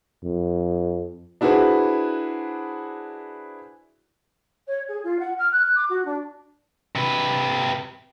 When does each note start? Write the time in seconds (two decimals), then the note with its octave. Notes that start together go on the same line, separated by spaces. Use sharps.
0.23 F2
1.41 D4 E4 F#4 G#4 B4 C5
4.68 C#5
4.87 G#4
5.03 F4
5.19 F#5
5.37 F6
5.51 F#6
5.76 D6
5.88 F#4
6.05 D4
6.95 C3 B4